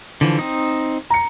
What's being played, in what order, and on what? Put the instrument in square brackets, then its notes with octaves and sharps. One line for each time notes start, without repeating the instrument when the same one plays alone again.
[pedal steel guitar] D3 E3 F3
C4 D#4
[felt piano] A#5 C#7